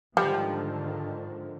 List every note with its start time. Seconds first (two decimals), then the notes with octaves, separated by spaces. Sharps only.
0.17 G#2 D3 D#3 F3 G3 G4